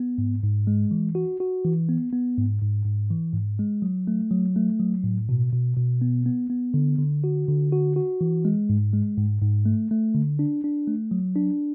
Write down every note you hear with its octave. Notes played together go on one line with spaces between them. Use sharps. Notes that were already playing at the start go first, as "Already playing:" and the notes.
Already playing: B3
G#2
G#2
G#3
E3
F#4
F#4
E3
B3
B3
G#2
G#2
G#2
E3
G#2
G#3
F#3
A3
F#3
A3
F#3
A2
B2
B2
B2
B3
B3
B3
D3
D3
F#4
D3
F#4
F#4
E3
G#3
G#2
G#3
G#2
G#2
A3
A3
D3
D4
D4
A3
F#3
D4